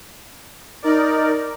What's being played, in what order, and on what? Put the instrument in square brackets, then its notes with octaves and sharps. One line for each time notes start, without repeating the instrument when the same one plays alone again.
[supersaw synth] D#4 A#4 D5